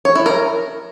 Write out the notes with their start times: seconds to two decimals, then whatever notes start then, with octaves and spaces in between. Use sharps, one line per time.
0.05 C#5
0.15 E4
0.26 A#4